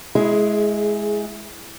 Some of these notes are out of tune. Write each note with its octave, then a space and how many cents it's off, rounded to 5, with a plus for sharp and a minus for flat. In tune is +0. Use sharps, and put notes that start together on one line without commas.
G#3 +20 E4 +0 G#4 +5